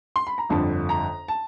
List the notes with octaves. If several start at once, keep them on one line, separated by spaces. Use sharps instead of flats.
C6
B5
A#5
G1 F2 D3 A5
A#5
A5